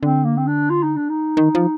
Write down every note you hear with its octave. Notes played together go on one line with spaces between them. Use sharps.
D3 C4
A#3
C4
D4
F4
D#4
D4
D#4
D#3
F3